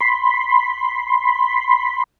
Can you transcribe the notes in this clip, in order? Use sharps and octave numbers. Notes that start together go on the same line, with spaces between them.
B5 C6